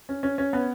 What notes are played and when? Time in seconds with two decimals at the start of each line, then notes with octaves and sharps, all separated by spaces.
0.09 C#4
0.23 C#4
0.38 C#4
0.53 B3